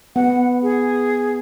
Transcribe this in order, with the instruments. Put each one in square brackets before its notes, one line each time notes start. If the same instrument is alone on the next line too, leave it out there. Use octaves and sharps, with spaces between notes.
[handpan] B3 [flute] F#5
[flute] G#4